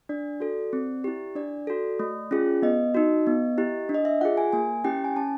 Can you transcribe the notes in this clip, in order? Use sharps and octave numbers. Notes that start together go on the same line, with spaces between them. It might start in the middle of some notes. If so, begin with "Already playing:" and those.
D4 D5
F#4 A4
C4
E4 G4
D4 D5
F#4 A4
A3
C#4 F4 G#4
B3 D#5
D#4 F#4
B3
E4 G4
D4
D#5
E5
F4 G#4 F#5
G#5
A#3 G#5
C#4 E4 G4 G5
G#5
C#4 A5